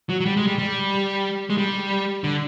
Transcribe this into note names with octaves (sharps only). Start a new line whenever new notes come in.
F#3
F#3
G3
G#3
G3
G3
G#3
G3
D3